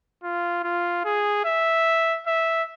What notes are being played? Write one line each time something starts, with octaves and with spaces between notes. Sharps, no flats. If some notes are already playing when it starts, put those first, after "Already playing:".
F4
F4
G#4
E5
E5